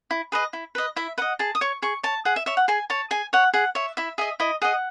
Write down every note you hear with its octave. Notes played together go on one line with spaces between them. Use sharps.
E4
G#4 B4 D#5
E4
B4 D#5
E4 E5
B4 D#5 F#5
G#4 A5
D#6
C#5 C#6
G#4 C#6
C#5 A5
G#4 F#5
E5
C#5 E5
F#5
G#4 G#5
C#5 A5
G#4 G#5
C#5 F#5
G#4 F#5
C#5 E5
E4 E5
G#4 D#5 E5
E4 D#5
G#4 D#5 F#5